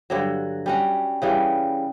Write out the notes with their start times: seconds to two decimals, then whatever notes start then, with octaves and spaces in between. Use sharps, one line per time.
0.10 G2 D3 F#3
0.66 G3 C#4 F#4
1.22 C#3 E3 G3